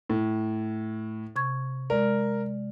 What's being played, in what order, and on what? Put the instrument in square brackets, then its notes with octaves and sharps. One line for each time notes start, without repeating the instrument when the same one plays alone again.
[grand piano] A2
[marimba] C3 C#6 G#6
[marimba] G#3 D5 [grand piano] A#4